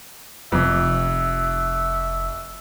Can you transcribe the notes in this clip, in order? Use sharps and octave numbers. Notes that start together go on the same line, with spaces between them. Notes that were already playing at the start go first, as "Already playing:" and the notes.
F1 F2 E5 D6